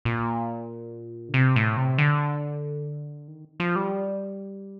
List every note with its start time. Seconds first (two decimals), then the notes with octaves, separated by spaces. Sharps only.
0.05 A#2
1.29 D3
1.34 C3
1.56 A2
1.77 C3
1.98 D3
3.28 D#3
3.60 F3
3.76 G3